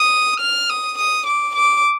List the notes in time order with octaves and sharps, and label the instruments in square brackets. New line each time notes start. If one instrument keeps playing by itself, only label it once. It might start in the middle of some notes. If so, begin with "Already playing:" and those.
Already playing: [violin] D#6
F6
D#6
D#6
D6
D6